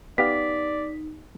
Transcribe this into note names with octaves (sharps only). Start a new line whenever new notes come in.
B3 D#4 G4 D5 F5 B6